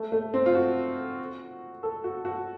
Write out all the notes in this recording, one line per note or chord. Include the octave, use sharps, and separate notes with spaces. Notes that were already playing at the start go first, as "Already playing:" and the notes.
Already playing: A3
A3
C4
F4
F#4
A4
F#4
F#4